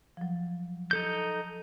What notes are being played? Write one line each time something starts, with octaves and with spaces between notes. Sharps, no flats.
F3 F#3
D#4 A4 G6